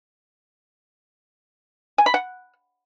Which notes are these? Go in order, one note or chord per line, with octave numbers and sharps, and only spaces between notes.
G#5
B5
F#5